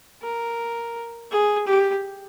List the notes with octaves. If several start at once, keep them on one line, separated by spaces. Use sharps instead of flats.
A#4
G#4
G4